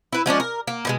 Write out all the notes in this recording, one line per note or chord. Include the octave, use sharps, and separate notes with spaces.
E4 B4
F3 G#3 C#4 D4
A#4
A#3
B2 D#3 G#3